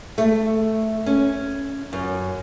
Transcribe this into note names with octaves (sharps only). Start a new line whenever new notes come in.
A3
C#4
F#2